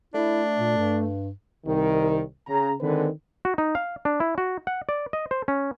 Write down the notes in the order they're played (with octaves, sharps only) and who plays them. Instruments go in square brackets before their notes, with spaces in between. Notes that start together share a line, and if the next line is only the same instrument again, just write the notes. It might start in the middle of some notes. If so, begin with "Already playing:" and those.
[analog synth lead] A3 [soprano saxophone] D4 [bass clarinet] E4
[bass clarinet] A#2
G2
[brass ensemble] C2 D#3
C#3 A#5
D3 D#3 G#3 C4 B4
[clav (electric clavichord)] F#4
D#4
F5
D4
E4
F#4
F#5
D5
D#5
C5
C#4